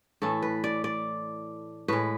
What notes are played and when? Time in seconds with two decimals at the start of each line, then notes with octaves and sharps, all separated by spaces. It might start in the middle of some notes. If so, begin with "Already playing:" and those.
0.22 A2 E3 A3 A4
0.42 B4
0.64 D5
0.84 D5
1.88 A2 G#3 B4